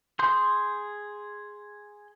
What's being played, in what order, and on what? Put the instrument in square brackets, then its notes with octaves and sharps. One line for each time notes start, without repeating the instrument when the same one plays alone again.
[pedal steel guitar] G#4 C6 G6